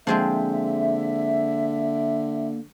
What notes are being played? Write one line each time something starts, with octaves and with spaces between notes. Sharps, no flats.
D3 F3 G#3 A#3 C4 E5